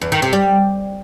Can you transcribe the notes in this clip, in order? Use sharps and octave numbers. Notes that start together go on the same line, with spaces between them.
E2
D#3
C3
G3